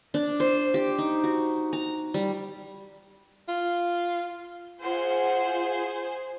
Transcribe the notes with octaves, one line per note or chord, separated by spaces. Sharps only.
D4
C5
G4
D#4
F#4
A#5
G3
F4
F4 G#4 C5 F#5